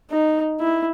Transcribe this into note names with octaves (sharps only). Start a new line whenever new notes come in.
D#4
E4